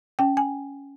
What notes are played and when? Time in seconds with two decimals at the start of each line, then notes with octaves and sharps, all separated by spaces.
0.19 C#4 G5
0.37 G#5